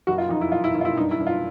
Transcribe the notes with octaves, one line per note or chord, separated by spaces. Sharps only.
F#1 F#4
F4
F2 D#4
E4
F#1 F4
E4
F#1 E4
F4
E4
G2 D#4
E4
G2
F4